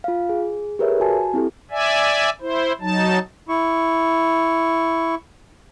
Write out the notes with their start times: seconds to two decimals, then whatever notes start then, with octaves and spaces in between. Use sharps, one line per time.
0.04 F4 F5
0.29 G#4
0.79 G4 G#4 A#4 B4 C#5 E5
1.00 F#4 G#5 A5
1.34 C4 E4 G4 A4
1.71 D5 E5 G#5
2.41 E4 C5
2.81 F#3 D#4 A5
3.49 E4 C#6